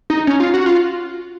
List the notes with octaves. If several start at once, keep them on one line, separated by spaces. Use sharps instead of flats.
D#4
C#4
F4
F#4
F4